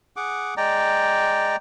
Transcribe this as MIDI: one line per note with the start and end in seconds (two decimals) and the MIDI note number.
0.16 0.54 68
0.16 0.54 78
0.16 0.54 86
0.57 1.56 56
0.57 1.56 74
0.57 1.56 79
0.57 1.56 82